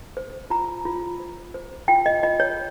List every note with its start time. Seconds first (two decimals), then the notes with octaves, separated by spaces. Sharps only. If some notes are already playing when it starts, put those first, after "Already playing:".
0.17 C5
0.50 F4 A#5
0.85 F4
1.20 C5
1.54 C5
1.88 F4 G5
2.06 D#5
2.23 F4 D#5
2.40 C#5